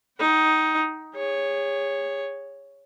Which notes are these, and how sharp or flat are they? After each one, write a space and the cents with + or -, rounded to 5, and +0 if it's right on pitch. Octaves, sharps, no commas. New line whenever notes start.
D#4 +10 G5 -45
G#4 -35 C#5 +0